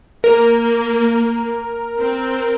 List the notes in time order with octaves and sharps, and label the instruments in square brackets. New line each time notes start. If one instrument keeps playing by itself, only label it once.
[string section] A#3 [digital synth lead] A#4
[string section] C4